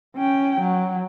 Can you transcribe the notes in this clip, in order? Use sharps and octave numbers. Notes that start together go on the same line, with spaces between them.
C#4 G5
F#3